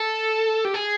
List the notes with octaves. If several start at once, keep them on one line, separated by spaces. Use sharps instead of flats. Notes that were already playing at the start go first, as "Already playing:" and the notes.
Already playing: A4
G4
G#4